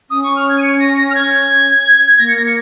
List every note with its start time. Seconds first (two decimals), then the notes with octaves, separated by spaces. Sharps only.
0.10 C#4 D#6
0.23 C#6
0.36 F6
0.49 G#6
0.58 D#7
0.63 C#7
0.80 A#6
0.97 A#6
1.10 F6
1.15 G#6
2.19 A#3 A#6
2.28 C#7
2.37 A#6
2.45 C#7